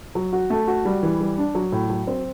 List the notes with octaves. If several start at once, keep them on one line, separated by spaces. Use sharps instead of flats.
F#3
F#4
A3
F#4
G3
E3
G3
D4
F#3
A2
F#3
C4